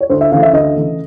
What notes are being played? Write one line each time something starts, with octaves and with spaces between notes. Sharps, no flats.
C#5
D2 C5
E5
C#3 E3 A3 F5
E5
D2 D#5
C#3 E3 A3